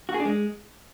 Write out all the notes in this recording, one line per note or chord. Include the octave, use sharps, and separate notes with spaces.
F#4
G#4
D4
G#3